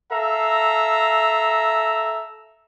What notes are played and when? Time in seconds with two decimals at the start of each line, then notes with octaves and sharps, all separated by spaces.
0.11 A4 E5 F5 A#5